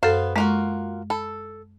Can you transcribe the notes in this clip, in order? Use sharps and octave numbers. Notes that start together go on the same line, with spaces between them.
F#2 B3 A4 C5 F5
G#3 A#3 F4 F#4
A4 B5